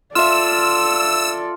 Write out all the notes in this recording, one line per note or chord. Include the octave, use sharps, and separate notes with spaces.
F4 A4 D5 E5 E6